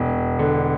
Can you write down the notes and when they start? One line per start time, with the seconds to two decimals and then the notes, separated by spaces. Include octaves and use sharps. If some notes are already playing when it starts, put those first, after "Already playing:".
Already playing: E1
0.39 D3